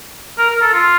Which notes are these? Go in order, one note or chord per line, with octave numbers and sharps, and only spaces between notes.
A#4
A#4
A4
F4